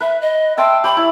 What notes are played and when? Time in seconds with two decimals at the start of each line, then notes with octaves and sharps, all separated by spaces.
0.01 B4 E5
0.21 D#5
0.57 E5 G5 A5 C6
0.84 G4 C#5 B5
0.97 E4